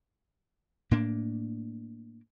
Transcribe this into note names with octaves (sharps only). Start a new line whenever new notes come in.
A2 A#3 D4